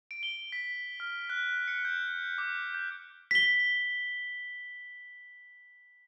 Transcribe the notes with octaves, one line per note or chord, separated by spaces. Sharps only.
D7
G7
B6
F6
F#6
C#7
G6
D6
G6
B6 G7